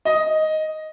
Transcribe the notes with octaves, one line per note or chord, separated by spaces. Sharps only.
D#5